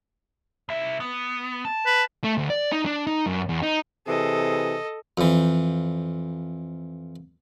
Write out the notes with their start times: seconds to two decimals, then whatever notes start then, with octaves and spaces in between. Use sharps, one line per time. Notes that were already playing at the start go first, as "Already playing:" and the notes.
0.69 C2 E5
1.00 B3
1.65 A5
1.86 B4
2.24 A3
2.38 D2
2.50 D5
2.72 D#4
2.86 D4
3.07 D#4
3.26 F#2
3.49 E2
3.63 D#4
4.07 C3 E3 G#4 A4 D#5
5.18 F2 E3